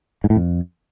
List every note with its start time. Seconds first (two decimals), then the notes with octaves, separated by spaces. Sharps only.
0.24 G#2
0.30 A2
0.36 F2